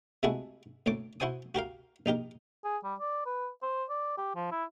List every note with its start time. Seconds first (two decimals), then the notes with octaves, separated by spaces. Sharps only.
0.23 C3 G#3 A3 E4 F#4 G#4
0.86 D2 A2 C#5 D6
1.20 E4 F#4 C5 G#5 D#6
1.55 F#4 G4 A#4 F5
2.06 A#1 D#4 G4 A#4
2.65 G#4
2.84 G3
3.00 D5
3.26 B4
3.62 C5
3.90 D5
4.18 G4
4.35 F3
4.52 E4